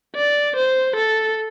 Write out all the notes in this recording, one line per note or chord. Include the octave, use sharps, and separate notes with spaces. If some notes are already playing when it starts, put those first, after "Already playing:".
D5
C5
A4